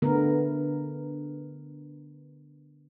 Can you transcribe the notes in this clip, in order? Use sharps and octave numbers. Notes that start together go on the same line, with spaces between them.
D3 A3 B3 A#4